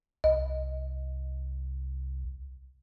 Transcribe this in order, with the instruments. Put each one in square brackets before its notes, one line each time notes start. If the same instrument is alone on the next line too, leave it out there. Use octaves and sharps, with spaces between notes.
[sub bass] C2 [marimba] D#5